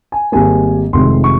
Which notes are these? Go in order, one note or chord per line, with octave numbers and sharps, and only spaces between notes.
G#5
G#1 G#2 G3 A#3 G#5
F1 F2 C3 D#3 G#3 C6
C#6